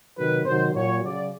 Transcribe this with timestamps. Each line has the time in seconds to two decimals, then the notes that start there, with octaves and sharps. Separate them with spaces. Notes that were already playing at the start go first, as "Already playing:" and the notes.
0.16 C3 D#3 F#3 B4
0.45 C3 D#3 F#3 C5
0.74 A#2 F#3 C#5
1.03 C#3 F#3 D5